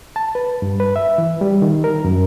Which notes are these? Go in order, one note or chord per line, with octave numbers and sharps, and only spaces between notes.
A5
B4
G2
B4
E5
E3
G3
D#3
A#4
F#2